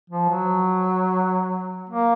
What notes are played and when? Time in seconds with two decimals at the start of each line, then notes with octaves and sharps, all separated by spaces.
0.10 F3
0.29 F#3
1.89 A#3